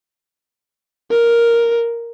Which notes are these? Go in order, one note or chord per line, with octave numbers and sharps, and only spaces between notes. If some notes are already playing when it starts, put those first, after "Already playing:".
A#4